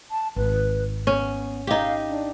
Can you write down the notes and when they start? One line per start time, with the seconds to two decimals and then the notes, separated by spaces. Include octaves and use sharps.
0.11 A5
0.36 G#1 B4
1.07 B3 C#4
1.67 D#4 G4 F5
2.08 D4